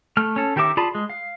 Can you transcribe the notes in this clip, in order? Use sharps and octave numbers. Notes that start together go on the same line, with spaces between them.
A3 F6
C#4 A4
D#3 G4 A#4 E5 D6
F4 G#4 D5 A5 B5
G#3
F5